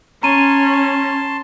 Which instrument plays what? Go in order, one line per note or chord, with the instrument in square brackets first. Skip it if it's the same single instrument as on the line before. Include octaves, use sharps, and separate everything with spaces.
[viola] C#4 [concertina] A5 C6 [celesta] A#5 D#7